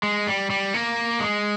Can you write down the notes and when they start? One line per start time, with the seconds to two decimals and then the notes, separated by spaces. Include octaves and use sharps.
0.03 G#3
0.27 G3
0.50 G3
0.74 A#3
1.20 G#3